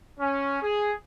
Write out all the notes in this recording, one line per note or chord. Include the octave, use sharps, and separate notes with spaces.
C#4
G#4